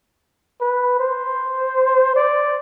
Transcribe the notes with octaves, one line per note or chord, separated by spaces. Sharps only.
B4
C5
D5